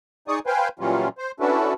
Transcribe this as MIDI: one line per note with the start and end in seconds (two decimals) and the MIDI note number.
0.28 0.39 63
0.28 0.39 68
0.28 0.39 74
0.28 0.39 85
0.28 0.39 87
0.46 0.68 71
0.46 0.68 72
0.46 0.68 77
0.46 0.68 79
0.46 0.68 80
0.79 1.08 46
0.79 1.08 52
0.79 1.08 54
0.79 1.08 55
0.79 1.08 61
0.79 1.08 65
1.18 1.32 72
1.40 1.74 61
1.40 1.74 62
1.40 1.74 64
1.40 1.74 66
1.40 1.74 69
1.40 1.74 71